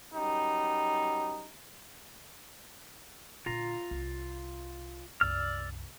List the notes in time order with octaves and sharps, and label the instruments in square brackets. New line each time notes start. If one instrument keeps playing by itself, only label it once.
[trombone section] F#2 G3 D#4
[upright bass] A#2 D3 [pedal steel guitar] F4 A#5
[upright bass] C2
[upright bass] C2 F#2 [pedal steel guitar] D5 E6 F6